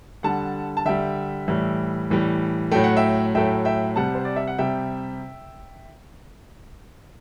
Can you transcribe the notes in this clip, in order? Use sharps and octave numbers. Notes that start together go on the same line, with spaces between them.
D3 G3 F#5 A5
A5
D3 G3 E5 G5
A2 E3 G3
A2 E3 G3
A2 F#3 A3 G5
F#5
E5 G5
A2 F#3 A3 E5 G5
E5 G5
C3 G3 F#5 A5
C5
D5
E5
F#5
C3 G3 E5 G5